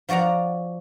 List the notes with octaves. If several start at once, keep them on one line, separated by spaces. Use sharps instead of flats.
F3 F#4 D5 F#5 A#5